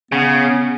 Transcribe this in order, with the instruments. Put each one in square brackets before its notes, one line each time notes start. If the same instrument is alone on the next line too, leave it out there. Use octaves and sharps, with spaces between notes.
[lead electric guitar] C#3 [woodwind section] B3